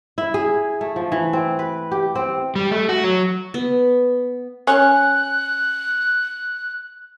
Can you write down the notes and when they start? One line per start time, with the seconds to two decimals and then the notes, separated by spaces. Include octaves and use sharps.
0.18 E4
0.34 G#4
0.81 A3
0.96 F3
1.12 E3
1.33 C4
1.59 B4
1.91 G4
2.15 C4
2.56 G3
2.70 A3
2.89 F#4
3.04 F#3
3.54 B3
4.67 C#4 F#6